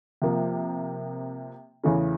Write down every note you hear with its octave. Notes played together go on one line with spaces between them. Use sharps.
C3 F3 A#3
E2 C#3 E3 A3 C#4